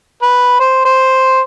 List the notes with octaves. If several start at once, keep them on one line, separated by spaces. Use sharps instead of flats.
B4
C5
C5